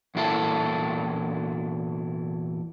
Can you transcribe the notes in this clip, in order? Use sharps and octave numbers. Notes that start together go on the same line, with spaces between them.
E2 A#2 E4 A4